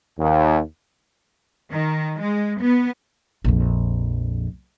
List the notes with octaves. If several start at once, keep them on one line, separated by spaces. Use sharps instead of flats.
D#2
D#3
G#3
B3
A#1 F2